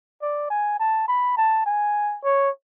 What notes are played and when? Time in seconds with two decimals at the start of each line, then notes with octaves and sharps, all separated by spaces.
0.22 D5
0.50 G#5
0.80 A5
1.08 B5
1.37 A5
1.66 G#5
2.24 C#5